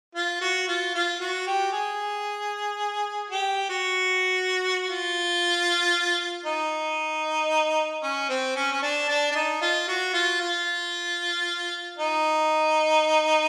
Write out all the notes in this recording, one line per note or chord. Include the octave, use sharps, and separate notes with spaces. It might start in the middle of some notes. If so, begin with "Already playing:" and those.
F4
F#4
F4
F4
F#4
G4
G#4
G4
F#4
F4
D#4
C#4
C4
C#4
C#4
D4
D4
D4
D#4
F4
F#4
F4
F4
D#4